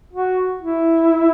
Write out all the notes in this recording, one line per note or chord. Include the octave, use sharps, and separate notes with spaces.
F#4
E4